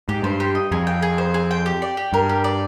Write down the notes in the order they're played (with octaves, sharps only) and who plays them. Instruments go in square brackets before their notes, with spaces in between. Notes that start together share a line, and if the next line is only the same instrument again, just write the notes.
[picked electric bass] G#2 [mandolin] G4
[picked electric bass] G2 [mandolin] C5
[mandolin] G4
D#5
[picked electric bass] F2 [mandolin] G#4
[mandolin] G5
G#4
C5
G#4
G5
G4
D5
G4
[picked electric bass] G2 [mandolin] A#4
[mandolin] G4
D5